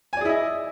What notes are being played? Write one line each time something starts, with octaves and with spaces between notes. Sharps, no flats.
E4 G#4 D5 D#5 G#5